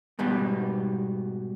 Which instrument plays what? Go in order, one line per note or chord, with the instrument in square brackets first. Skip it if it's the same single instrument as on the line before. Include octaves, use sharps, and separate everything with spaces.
[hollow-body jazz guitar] G#2 B2 G3 B3